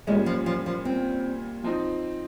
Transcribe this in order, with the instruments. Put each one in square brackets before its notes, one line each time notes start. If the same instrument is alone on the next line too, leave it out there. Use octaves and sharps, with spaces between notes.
[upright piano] A#2 G3 C#4 [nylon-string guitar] G#3
[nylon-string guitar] F3
F3
F3
C4
[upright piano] F3 C4 D#4